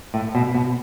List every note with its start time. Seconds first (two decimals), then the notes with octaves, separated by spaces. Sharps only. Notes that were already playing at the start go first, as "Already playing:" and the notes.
0.14 A2
0.35 B2
0.55 B2